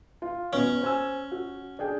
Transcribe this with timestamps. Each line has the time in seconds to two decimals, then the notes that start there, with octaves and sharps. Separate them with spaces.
0.22 F4
0.53 B2 B3 C#4
0.82 C5 G#5 E6
1.32 F#4
1.79 D4 G#4 G5